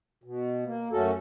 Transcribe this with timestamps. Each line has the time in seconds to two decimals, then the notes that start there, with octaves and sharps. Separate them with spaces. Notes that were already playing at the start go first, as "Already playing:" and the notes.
0.24 B2
0.65 A#3
0.92 F#2 A3 C#4 F#4 A4